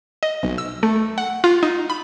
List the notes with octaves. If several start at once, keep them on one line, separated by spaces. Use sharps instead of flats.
D#5
B1
E6
A3
F#5
F4
D#4
B5